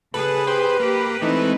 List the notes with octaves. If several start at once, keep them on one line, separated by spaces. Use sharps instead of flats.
C#3 G#4 A4 B4
G4 B4 C5
A#3 G4
E3 G#3 A3 C4 D#4